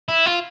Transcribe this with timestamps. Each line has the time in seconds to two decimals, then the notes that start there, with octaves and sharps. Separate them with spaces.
0.09 E4
0.26 F4